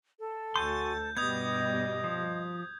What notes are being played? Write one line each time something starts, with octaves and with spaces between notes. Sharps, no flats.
A4
D2 F#4 G#5 C6 G6 A6
G2 B2 G3 B3 D#5 D#6 G6 G#6
F3